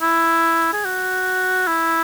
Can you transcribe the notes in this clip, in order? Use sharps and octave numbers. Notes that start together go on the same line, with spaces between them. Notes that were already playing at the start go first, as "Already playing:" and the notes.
E4
G#4
F#4
E4